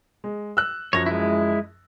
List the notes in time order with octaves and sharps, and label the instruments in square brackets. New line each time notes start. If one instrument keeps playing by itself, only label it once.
[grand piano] G#3
E6 F#6
[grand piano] F#2 F3 A#6 [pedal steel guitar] C#5
[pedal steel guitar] G#3 E4